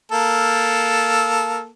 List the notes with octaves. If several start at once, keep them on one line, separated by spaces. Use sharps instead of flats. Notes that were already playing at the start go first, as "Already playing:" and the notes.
A#3 A4